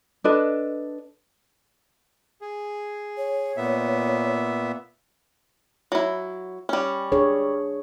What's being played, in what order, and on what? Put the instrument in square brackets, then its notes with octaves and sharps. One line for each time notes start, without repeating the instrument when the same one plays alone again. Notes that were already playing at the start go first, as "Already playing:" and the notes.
[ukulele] D4 A4 B4 D#5
[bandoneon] G#4
[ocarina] C#5
[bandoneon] A#2 B3 E5
[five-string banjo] F#3 E4
G3 C#4
[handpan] D4 G#4 C#5